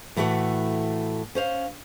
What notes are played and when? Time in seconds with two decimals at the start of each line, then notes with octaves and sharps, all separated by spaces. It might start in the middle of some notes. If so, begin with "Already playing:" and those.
0.16 A2 E3 A3 F#4 F#5
1.35 C#4 C5 F5